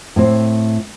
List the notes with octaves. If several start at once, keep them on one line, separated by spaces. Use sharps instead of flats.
A2 C4